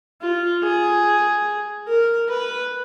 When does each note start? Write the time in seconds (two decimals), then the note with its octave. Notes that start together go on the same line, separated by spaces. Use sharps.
0.22 F4
0.63 G#4
1.88 A#4
2.30 B4